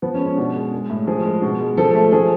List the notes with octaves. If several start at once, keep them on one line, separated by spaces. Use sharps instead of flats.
F3 B3
C#4
G#3
C#4
B2 D4
G#3
G#3
A2
F3 G#4
G#3
B2
G#3
F3 A4
A3
F3 G#4